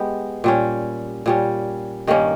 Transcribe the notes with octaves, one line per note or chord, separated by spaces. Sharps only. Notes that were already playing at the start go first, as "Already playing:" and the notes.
Already playing: G#3 B3 G4
A#2 G3 C#4
A#2 G3 C#4
G2 D#3 A#3 C#4